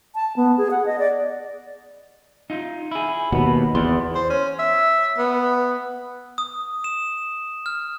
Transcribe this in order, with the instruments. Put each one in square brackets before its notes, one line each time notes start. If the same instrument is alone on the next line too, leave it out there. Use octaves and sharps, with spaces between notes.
[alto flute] A5
B3
G#4
F#5
D#5
D5
[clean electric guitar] D#4 F4
E4 G#4
[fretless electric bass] D#2 B2 [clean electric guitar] F#5 B5
[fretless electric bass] E2 [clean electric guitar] B3 D5 C6
[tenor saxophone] C5
C#4
E5
B3
[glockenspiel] D#6
E7
F6